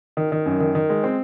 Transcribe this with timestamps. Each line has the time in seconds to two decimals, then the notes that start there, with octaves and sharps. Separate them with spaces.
0.17 D#3
0.32 D#3
0.46 F#2
0.60 D#3
0.75 D#3
0.90 G#3
1.04 C4